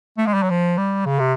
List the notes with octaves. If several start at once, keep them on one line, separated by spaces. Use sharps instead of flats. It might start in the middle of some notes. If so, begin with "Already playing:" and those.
A3
G#3
G3
F#3
F3
G3
C#3
C3